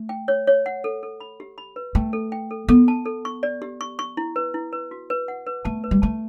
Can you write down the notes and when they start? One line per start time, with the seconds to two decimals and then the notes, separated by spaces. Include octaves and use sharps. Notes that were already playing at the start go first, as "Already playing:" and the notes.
Already playing: A3
0.09 G5
0.28 C#5
0.47 C#5
0.66 F#5
0.84 A4
1.03 A4
1.20 B5
1.40 G4
1.58 B5
1.76 B4
1.95 A3 G5
2.13 A4
2.32 G5
2.51 A4
2.69 B3 A4
2.88 A5
3.05 A4
3.25 C#6
3.43 D5
3.62 G4
3.81 C#6
3.99 C#6
4.17 E4
4.36 B4
4.54 E4
4.73 B4
4.91 F#4
5.10 B4
5.28 F#5
5.47 B4
5.65 A3 A5
5.84 B4
5.91 G3
6.02 A3 A5